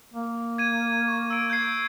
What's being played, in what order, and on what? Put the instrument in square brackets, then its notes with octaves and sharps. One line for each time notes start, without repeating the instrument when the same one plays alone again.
[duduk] A#3
[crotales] G#6 D#7
C#6
E6 D7
G6 G#6 C7